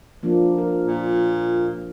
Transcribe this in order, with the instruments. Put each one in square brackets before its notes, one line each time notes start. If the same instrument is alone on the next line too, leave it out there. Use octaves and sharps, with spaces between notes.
[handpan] F3 A#3 D4
A#4
[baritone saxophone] A#2